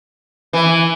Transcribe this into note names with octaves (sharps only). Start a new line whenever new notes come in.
E3